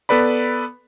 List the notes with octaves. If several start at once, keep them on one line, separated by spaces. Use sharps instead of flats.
B3 A4 B4 D5 B5